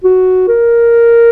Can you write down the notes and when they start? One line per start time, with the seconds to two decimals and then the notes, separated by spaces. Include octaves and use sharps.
0.04 F#4
0.48 A#4